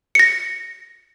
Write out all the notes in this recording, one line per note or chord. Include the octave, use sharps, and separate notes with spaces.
A#6 C#7